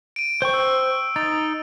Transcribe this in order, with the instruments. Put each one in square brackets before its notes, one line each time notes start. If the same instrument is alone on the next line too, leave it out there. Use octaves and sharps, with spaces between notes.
[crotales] D7 D#7
[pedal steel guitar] C5 G5 C#6
[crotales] E6
[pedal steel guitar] D#4 [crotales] A6